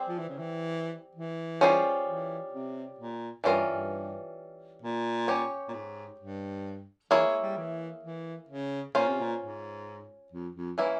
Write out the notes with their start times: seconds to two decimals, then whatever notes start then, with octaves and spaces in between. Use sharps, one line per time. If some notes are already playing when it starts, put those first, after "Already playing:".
Already playing: G3 C4 G#4 C5
0.08 F3
0.19 E3
0.29 C#3
0.39 E3
1.15 E3
1.61 G3 C#4 F4 G#4 C5
2.06 E3
2.53 C3
2.98 A#2
3.44 G2 E3 G3 C#4 F4 A#4
3.67 G2
4.82 A#2
5.28 C#4 G4 C#5
5.68 A#2
5.74 G#2
6.20 G2
7.11 E3 A#3 E4 G#4 C#5
7.26 G#3
7.42 G3
7.57 E3
8.03 E3
8.49 C#3
8.95 A#2 C#4 F4 C5
9.08 C3
9.21 A#2
9.41 G#2
10.32 F2
10.55 F2
10.78 E3 A#3 C#4 E4